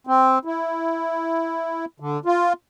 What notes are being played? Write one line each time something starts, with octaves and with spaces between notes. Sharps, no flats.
C4
E4
D3
F4